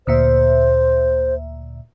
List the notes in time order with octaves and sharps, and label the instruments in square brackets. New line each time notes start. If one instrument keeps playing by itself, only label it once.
[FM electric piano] D2 A#2 E5 [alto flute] C5